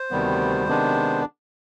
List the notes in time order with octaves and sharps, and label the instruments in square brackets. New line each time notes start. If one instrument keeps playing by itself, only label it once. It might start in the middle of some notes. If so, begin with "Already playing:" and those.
Already playing: [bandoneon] C5
D2 C3 D#3 G3 B3
C3 D#3 G#3 B3 D4